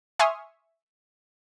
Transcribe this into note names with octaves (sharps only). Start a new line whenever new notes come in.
E5 G#5 C6 C#6 D#6 F6